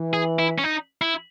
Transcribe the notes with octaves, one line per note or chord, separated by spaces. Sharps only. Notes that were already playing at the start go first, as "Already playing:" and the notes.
Already playing: E3
G#4
E4
C#4
D#4
E4